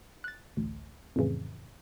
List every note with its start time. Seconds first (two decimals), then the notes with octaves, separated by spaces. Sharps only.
0.24 F#6 A6
0.57 A1 D2
1.16 F2 A2 C#3 E3